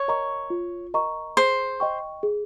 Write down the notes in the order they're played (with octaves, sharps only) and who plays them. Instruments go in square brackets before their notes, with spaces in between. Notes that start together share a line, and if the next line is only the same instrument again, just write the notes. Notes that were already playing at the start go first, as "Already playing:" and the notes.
Already playing: [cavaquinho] C#5
[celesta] A#4 D#5 A#5 C#6
F4
A#4 D#5 A#5 C#6
[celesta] G#4 [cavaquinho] C5
[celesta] D#5 G5 C#6
G#4